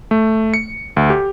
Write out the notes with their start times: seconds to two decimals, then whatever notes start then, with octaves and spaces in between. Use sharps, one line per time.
0.11 A3
0.54 C#7
0.96 D2
1.10 G4